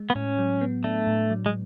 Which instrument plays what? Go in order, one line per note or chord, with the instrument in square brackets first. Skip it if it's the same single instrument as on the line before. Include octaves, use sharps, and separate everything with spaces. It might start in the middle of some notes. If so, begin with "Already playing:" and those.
Already playing: [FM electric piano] G#3
[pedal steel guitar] B3
[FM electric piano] A2 [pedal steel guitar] C#4
[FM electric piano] F#3
B3
[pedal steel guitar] A3 [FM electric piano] D4
[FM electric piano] A2
F#3
[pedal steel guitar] G#3